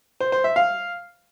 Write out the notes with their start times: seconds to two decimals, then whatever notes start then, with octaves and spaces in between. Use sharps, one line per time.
0.20 C5
0.32 C5
0.44 E5
0.56 F5